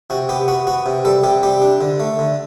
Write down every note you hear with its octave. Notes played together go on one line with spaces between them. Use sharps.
C3 F#4
B3 G4
B3 F#4
B3 F#4
C3
G3 A4
C3 G4
G3 G4
D4
D3
A3
D3